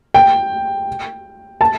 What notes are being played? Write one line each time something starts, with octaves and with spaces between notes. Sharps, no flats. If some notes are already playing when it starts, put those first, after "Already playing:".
G5
A5